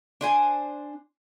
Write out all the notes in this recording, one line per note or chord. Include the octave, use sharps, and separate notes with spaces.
D4 C5 G#5